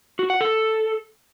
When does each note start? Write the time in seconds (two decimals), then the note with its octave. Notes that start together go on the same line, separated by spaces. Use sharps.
0.19 F#4
0.30 F#5
0.41 A4